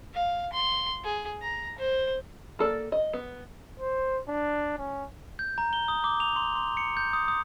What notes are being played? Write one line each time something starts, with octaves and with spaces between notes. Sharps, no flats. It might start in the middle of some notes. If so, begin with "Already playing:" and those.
F5
C6
G#4
A#5
C5
A#3 A4 D5
D#5
B3
C5
D4
C#4
G6
A#5
G7
D#6
D6
F7
C6
C6
C#7
G6
D#6
D#6